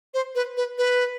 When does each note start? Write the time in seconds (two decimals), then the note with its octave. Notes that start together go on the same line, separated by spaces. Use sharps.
0.14 C5
0.35 B4
0.57 B4
0.78 B4